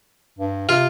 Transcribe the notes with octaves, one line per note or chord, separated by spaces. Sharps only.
G2
C3 F4